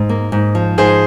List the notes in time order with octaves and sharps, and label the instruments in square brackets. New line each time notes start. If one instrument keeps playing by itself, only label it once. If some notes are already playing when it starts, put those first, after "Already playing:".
Already playing: [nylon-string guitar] G#2
A#3
G#2
F3
[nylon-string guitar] G#2 [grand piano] G#4 C5